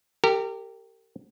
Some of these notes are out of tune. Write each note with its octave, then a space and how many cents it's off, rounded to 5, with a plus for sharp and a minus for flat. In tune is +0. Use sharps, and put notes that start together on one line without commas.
G4 +0 A#4 -35